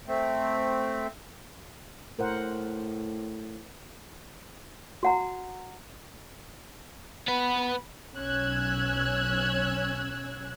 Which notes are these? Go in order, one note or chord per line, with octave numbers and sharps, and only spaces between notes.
A3 C4
A2 A#4 C5 F#5
F#4 F#5 A#5
B3 B4 B5
B1 C#4 E6 F#6 G#6